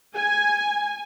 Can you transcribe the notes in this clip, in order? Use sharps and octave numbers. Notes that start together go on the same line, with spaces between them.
G#5